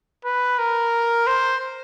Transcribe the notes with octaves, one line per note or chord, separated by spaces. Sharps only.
B4
A#4
C5